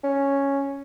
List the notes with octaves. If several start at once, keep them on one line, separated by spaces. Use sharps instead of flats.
C#4